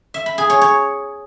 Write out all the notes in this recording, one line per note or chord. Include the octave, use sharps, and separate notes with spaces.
E5
B5
G#4
C#5
C#5